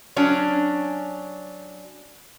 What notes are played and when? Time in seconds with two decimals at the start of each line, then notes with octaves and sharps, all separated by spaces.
0.16 F#3 C#4 D4